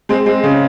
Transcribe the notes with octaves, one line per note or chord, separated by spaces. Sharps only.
G#3 C4
G#3 C4
C#3